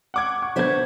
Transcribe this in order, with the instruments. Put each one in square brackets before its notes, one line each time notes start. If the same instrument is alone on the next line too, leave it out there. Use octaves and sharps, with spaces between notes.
[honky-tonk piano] F#5 D6 G#6
F#5 C#6
[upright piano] D3 B3 G#6 [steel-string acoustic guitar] B4 C5 E5